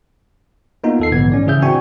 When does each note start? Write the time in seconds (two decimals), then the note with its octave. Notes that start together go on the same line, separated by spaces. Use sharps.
0.84 A#3 B3 D#4 F4
1.00 D#2 A4 C7
1.12 A#1 G#2 D3 E3 B3 G#6
1.32 G#2 C#4 D5
1.46 A2 C#3 E3 G#4 E5 G6
1.62 C4 D4 F#4 G5 G#5 C#6